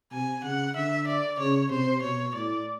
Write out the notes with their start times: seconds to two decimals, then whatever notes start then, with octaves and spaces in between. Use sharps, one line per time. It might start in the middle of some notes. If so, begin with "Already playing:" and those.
0.12 C3 G#5
0.43 C#3 F#5
0.75 D3 E5
1.07 D5
1.39 C#3 C#5
1.71 C3 C5
2.02 B2 C#5
2.34 A2 D5